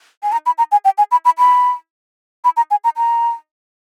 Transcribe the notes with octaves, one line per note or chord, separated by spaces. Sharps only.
G#5
A#5
B5
A#5
G#5
G5
G#5
B5
B5
B5
B5
A#5
G#5
A#5
A#5